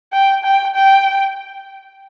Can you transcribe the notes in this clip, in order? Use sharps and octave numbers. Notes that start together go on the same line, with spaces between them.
G5
G5
G5